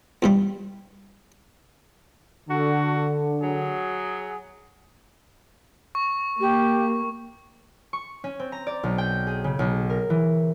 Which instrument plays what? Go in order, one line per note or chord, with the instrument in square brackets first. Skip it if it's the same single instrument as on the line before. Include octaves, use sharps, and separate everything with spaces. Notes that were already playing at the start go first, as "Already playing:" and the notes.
[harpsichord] E2 G2 G3
[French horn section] D3 [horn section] F#4 A4
[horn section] F#3 G#4
[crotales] C#6
[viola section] A#3 [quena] G4
[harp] C#6
C#4
C4
A#5
D5
B1
G5
G#4
C#3
B1
A#4
E3